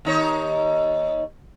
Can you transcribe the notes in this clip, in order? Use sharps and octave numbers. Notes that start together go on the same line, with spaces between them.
D#2 D#4 C#5